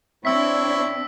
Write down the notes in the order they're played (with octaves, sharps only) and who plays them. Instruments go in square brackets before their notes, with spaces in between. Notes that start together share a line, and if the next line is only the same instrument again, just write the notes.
[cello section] C4 D4 [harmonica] E4 C#5 [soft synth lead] E5 [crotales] E6 B6